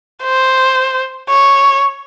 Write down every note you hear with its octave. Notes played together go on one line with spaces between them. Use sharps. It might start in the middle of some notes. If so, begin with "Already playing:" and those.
C5
C#5